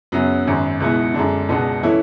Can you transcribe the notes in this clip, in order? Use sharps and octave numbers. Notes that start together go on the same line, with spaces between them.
F#2 C#3 F#3 B3
G#1 F#2 C#3
C#2 B2 G#3 B3 E4
F#2 D3 G#3 D4
C#2 B2 G#3 B3 D4
E3 A3 C#4 E4